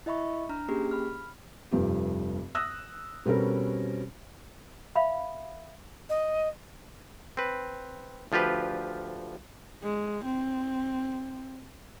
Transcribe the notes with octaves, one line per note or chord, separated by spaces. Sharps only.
E4 D#5 E5 B5 C#6
D4 A#5 F6
A#3 C#4 G4 G#4
B5 F6
F1 G2 F3 G4
D#6 E6 F#6 A#6
B2 G3 C4 C#4 A4 A#4
E5 F5 B5
D#5
C4 B4
D2 F3 F4 G4 B4
G#3
C4